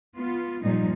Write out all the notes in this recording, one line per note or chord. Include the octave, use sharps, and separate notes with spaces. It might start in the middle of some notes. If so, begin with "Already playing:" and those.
B3 F4
G2 A#2 F3 G3 D#4